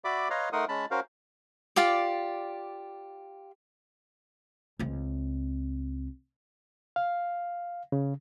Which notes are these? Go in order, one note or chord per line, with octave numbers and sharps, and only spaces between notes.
F#4 D5 E5 B5 D6
B4 C#5 D#5 F5 A#5 C6
A3 D#4 A#4 F#5 C6 D#6
G#3 C#4 A5 B5
C#4 F#4 A#4 C5 F5
F4 G4 D5
C#2 C4
F5
C#3